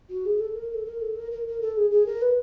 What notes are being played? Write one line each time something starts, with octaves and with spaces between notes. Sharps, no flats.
F#4
G#4
A4
A#4
A4
A#4
A4
A#4
A#4
A#4
A4
G#4
G#4
A#4
B4